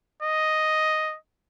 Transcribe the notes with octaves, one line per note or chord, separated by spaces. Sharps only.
D#5